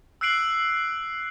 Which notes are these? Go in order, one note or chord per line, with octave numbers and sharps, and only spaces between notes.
E6 F#6 C7 D7 F#7